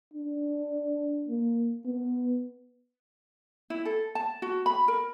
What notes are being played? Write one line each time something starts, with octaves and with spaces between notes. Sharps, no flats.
D4
A#3
B3
E4
A4
A5
F#4
B5
A#4